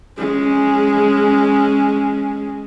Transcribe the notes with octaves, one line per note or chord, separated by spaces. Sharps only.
G#3 C#4